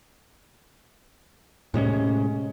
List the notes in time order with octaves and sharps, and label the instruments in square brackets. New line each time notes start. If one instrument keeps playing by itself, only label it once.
[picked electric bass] A2 C3 G#3 C#4